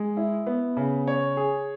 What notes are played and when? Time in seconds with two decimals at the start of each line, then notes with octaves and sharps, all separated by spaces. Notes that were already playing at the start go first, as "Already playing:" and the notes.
Already playing: G#3
0.17 E4
0.47 B3
0.77 C#3
1.08 C#5
1.37 G#4